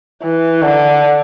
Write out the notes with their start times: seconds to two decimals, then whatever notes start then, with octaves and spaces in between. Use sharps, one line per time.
0.22 E3
0.62 D3